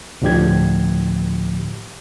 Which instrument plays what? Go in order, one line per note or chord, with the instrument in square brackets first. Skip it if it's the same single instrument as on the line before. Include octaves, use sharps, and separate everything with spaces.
[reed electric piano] D2 A2 D3 F3 G4 G#6